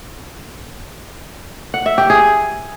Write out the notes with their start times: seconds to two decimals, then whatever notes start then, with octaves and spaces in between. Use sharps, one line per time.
1.74 F#5
1.86 E5
1.98 G4
2.10 G#4